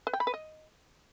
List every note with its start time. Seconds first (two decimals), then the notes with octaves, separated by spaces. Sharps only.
0.07 B4
0.13 G5
0.20 B5
0.27 B4
0.34 D#5